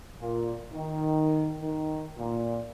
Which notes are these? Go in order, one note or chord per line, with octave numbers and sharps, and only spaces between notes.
A#2
D#3
D#3
A#2